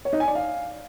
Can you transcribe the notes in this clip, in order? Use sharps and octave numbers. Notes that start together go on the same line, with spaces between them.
C#5
D#4
G#5
D5
F5